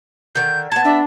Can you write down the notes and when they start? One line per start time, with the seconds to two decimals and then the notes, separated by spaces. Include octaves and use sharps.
0.35 D3 D#3 G6
0.72 B3 A5 G#6
0.84 D4 E5